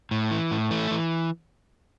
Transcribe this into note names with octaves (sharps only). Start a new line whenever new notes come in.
A2
E3
A2
E3 A3
E3